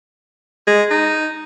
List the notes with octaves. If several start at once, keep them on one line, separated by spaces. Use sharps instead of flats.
G#3
D#4